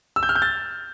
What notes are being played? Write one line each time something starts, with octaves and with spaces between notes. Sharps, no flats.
E6
G6
F6
G6
A6